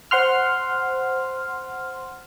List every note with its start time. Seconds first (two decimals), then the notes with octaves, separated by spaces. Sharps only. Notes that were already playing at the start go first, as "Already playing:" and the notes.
0.11 C5 F#5 C6 F6